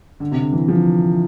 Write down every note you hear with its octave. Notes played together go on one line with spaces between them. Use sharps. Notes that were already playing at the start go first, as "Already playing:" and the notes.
D3
C3
D3
E3
F3